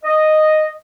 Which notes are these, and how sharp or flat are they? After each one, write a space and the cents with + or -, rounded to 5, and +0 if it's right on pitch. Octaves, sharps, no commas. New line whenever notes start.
D#5 -5